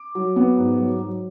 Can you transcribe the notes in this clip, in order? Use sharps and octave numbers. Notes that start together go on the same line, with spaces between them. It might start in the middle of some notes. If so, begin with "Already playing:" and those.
Already playing: D6
F#3
B3
G#2
F#3
F#3